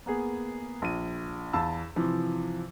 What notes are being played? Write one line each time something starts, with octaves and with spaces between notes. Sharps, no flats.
A#3 B3 G#4
A#1 D#7
E2 F5 A5 B5 E6
C3 E3 F3